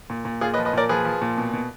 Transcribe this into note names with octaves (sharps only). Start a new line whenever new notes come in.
A#2
A#2
A#2 F4 G#4
B4 D#5
F3
B4 D#5
A#2 A#4 D5
F3 G#4 B4
F3
A#2
B2
B2